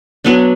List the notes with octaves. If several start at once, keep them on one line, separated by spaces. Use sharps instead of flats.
F#3 B3 D4